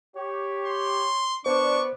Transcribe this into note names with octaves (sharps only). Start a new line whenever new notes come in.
G4 C#5
C6
B3 D4 C5 D5 C#6